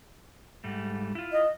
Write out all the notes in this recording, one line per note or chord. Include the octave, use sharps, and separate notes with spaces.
G#2 G3 A3
E4 F4
D#5